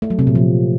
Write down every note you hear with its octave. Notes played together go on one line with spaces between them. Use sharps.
A3
F#3
C3
A#2
F3